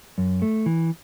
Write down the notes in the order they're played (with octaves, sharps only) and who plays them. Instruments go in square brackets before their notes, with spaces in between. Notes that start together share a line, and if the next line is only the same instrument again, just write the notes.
[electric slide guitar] F#2
A3
E3